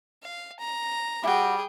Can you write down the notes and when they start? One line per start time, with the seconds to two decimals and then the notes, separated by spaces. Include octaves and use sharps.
0.23 F5
0.60 A#5
1.24 G3 E4 F#4 G#4 G5